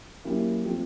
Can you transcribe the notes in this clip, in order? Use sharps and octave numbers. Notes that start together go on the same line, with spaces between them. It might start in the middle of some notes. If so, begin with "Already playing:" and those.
F#3 A#3 C#4 E4 G4
F3 A3 C4 F4